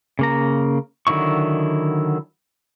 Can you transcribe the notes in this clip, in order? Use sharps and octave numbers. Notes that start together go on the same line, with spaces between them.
C#3 A#3 A#5
D3 D#3 F#3 E4 C#6